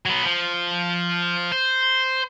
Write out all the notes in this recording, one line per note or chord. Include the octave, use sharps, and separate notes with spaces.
F#3 B3
F3
C5